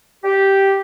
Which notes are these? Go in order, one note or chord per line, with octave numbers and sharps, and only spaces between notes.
G4